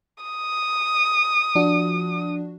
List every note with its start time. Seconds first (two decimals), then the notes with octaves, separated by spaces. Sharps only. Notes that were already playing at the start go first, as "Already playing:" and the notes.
0.24 D#6
1.55 F3 D4 F#4